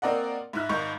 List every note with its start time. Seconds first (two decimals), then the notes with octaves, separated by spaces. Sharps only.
0.02 A#3 C4 A#4 D5 D#5 F#5
0.53 G#2 E4 F#6
0.69 G#1 G#2 D#4 C#6 G6